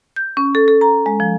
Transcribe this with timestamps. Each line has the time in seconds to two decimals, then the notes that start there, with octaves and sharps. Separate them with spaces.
0.16 G6
0.37 C#4
0.55 A4
0.68 A4
0.81 A#5
1.06 G#3
1.20 F3